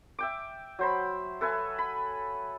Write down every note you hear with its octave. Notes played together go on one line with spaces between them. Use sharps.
E5 G5 D6
F#3 C5 B5
A4 B4 E5 G#5
B5